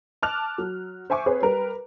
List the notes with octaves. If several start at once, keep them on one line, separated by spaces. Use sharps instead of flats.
A5 D6 F6 F#6 F7
F#3
C5 E5 G#5 C#6 D6
C4 G#4 B4 C#5
G3 A#4 B4